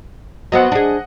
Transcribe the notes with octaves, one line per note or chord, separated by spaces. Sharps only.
F#3 B3 C4 D#5 F#5
D4 G#4